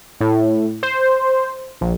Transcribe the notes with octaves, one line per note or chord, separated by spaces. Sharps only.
A2
C5
A#1